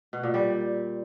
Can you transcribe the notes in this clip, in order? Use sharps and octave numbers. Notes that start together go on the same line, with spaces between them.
B2
A#2
G3